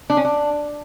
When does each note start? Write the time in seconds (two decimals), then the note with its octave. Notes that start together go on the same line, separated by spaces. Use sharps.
0.10 D4
0.17 C#4
0.25 D4